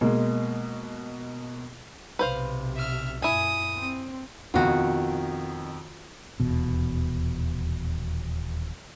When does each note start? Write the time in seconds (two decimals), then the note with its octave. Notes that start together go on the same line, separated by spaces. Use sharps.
0.01 B2 G#3 A#3
2.19 B1 C3 B4 C5 F5
2.75 E5 F6
3.22 F#2 A#2 E4 G#5 D#6
3.77 C4
4.54 F2 B2 D#3 F4 F#4
6.40 D#1 E2 B2